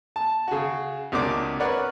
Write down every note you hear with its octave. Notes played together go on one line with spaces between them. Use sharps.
A5
C#3 F#4
C#2 C3 A#3 D4 F#4 D6
A#4 B4 C#5 D5 F#5